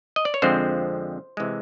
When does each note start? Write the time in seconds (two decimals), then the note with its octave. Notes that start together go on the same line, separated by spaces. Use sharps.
0.16 D#5
0.25 D5
0.34 C#5
0.42 F2 D3 F3 G#3 C4 C5
1.37 C3 E3 G#3